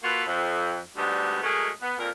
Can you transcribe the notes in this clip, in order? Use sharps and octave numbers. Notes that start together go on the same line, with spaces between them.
A#3 F4 F#4 A4 B4
F2
D2 G#2 G3 B3 D4 D#5
F#3 G#3 A3 G#4 A#4 D#5
B3
F2 A#2 A#4